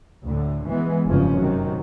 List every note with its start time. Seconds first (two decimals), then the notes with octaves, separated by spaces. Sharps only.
0.23 D2 A2 D3
0.69 E3 G#3 B3
1.04 F1 E2 G2 C#3 F3 C#4
1.38 F#2 C3 D#3 F#3